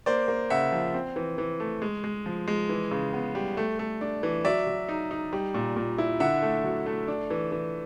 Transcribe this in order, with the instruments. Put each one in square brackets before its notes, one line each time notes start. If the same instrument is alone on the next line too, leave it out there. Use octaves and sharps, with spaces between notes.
[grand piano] A#3 C5 D5
A#3
C#3 E5 F#5
F3
C4
E3
E3
A3
G#3
G#3
F3
G#3
E3
C#3
B3
G3
A3
A3
D4
E3
F#3 D5 E5
F#3
D#4
D#4
G3
A#2
A#2
E4
D3 E5 F#5
A3
F#3
A3
D4
E3
E3